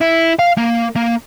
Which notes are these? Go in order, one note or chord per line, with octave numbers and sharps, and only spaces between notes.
E4
F5
A#3
A#3